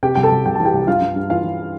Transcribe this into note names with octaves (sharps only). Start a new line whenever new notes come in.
C3 G4 G5
C2 G5
A4 A5
C2
C2 G5
E3 A5
G4 G5
C2
G2 F4 F5
G2
G2
E3 F4 F5
E3